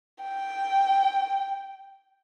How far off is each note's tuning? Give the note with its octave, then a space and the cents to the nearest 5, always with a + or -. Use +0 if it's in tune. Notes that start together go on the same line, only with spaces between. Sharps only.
G5 +0